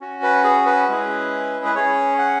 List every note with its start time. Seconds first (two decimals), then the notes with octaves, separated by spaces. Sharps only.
0.01 C#4 F#4
0.23 B4
0.44 G#4
0.66 B4
0.88 G#3 C#4 E4 G#4
1.65 B4
1.75 C#4 G#4 C#5
2.18 F#5